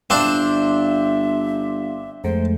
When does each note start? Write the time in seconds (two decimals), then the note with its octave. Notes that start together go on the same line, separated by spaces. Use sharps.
0.10 G1 C4 D4 E5 F5 C6 D6
2.24 F2 G#3 A3 C5